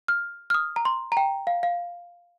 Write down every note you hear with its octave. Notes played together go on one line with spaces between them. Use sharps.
F6
F6
D#6
A#5
C6
A#5
G5
F5
F5